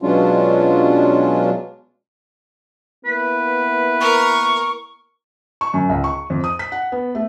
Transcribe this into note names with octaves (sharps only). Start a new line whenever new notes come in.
B2 F#3 G#3 C#4 D4 F4
A#3 B3 E4 B4
A#4 C#6
C#6
F#2
C#2
C#6
F2
D#6
B6
F#5
B3
A3